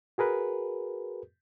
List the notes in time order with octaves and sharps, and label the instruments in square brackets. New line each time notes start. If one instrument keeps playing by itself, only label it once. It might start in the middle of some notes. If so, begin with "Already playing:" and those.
[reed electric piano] F#4 G#4 A#4 B4